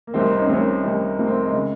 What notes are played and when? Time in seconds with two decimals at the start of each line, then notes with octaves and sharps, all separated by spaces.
0.07 A#3
0.13 C2 C3 D#3 C4
0.31 D#4
0.38 C#4
0.46 C4
0.49 C2 C3 D#3 C#4
0.83 C2 C3 D#3
1.19 C2 C3 D#3 A#3
1.27 C4
1.36 A#3
1.45 G#3
1.53 C#3